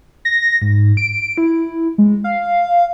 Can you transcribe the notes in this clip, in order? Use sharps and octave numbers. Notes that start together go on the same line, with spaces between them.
A#6
G#2
D7
E4
G#3
F5